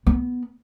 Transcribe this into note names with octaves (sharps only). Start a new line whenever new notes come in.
B3